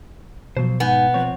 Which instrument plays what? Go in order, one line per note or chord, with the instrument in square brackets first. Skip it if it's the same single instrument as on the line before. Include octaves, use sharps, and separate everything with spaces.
[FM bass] B2 [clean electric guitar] F3 F#3 C5
[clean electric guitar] G#2 D#4 G#5 [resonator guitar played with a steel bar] B3
[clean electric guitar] F3 C4 C#5